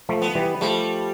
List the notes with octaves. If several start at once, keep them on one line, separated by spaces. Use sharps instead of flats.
F3 A3
B3
E3 G3
F3 G3 A3